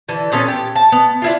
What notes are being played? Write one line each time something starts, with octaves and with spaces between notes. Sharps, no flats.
D3 E3 A4
A#2 B3 C#4 A4
G4
A5
B3
D4 E4 F4